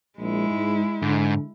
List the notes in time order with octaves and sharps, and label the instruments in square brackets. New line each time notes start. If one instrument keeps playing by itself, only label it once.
[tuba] A#1 [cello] G#3 E4
[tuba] G#2
[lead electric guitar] G#2 [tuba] D3